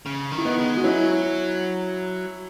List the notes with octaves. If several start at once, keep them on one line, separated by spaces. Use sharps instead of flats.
C#3
D#3
E4
B3 D#4
G#3
F#4
F#3 C#4 E4